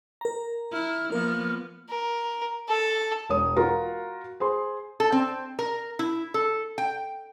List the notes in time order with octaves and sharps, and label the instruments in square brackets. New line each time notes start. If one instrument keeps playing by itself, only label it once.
[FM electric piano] A#4 A#5
[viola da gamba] E4 [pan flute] F6
[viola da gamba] F3 A#3 B3 [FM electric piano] A#4
[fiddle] A#4
A4
[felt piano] E1 C#5 D#6
F4 F#4 A#4 A#5
G#4 C5 C6
[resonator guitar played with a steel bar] A4
C4
A#4
E4
A4
G5